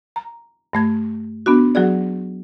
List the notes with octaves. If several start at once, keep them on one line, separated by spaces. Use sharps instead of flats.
A#5
G2 A3 G#6
B3 D4 F#4
F#3 F#4 G#4 D5